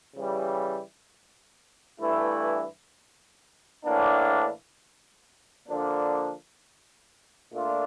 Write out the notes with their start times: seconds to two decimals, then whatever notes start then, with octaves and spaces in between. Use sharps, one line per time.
0.15 C#3 E3 G3
2.00 G2 E3 A3 E4
3.84 A2 E3 A#3 D4
5.68 D3 F3 A#3 D4
7.53 A#2 A3 D4 F4